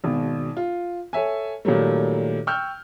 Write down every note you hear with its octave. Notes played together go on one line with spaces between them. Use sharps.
G#1 B2
F4
A4 C#5 E5 G#5
A#2 D#3 F#3 G3 A3
G5 C#6 E6 F6 G6